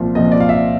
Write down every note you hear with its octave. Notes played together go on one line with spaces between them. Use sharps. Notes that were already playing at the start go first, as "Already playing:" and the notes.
Already playing: C2 A#2 F3
C2 A#2 F3 D#5
D5
F5
E5